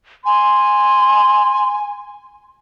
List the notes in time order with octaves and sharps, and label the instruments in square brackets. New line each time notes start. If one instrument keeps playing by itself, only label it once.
[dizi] G#5 [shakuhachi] C6